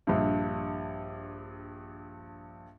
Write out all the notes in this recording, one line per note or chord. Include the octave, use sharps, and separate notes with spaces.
A#1 G2